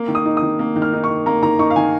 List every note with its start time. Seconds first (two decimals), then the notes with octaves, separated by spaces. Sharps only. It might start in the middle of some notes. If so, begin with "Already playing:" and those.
Already playing: A#3
0.08 D#3
0.15 D#6
0.25 D#4
0.37 D#6
0.42 D#3
0.59 A#3
0.76 D#3
0.82 F6
0.93 D#4
1.04 C#6
1.10 D#3
1.26 A#3 A#5
1.43 D#3 A#5
1.59 D#4 C#6
1.70 F5
1.76 D#3 G#5